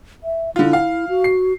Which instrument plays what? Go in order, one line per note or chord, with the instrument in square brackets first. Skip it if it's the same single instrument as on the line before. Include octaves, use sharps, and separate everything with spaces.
[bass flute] E5
[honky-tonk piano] D3 F4 [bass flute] E4
[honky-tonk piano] F5
[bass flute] F#4
[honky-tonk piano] C7